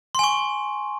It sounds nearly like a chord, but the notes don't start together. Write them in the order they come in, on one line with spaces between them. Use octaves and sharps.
C6 G#5 C#6